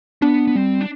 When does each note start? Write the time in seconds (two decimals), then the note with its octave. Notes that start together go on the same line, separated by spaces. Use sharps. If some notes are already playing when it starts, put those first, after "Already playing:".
0.22 B3 D4
0.47 B3
0.56 G3 C4
0.81 D4